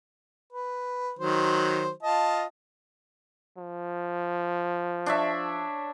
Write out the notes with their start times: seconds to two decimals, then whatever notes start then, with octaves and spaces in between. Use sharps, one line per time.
0.52 B4
1.19 D#3 F#3 C5
2.03 F4 D#5 A5
3.58 F3
5.06 D4 C#5 E5